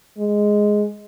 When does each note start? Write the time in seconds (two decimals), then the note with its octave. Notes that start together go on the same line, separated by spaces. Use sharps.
0.19 G#3